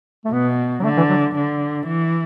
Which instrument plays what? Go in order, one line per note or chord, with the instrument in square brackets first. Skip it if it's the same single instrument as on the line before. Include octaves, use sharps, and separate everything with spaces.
[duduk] A3
[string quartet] B2 [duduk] B3
[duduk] F#3
[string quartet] D3 [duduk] A3
[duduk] E3
F#3
[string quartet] D3
E3